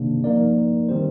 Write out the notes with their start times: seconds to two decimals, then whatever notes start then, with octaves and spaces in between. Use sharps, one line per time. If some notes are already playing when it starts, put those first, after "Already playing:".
Already playing: C3 D#3 A#3 D4
0.24 F3 A#3 D#4 A#4 D5
0.89 D#3 G3 C4 G4 C5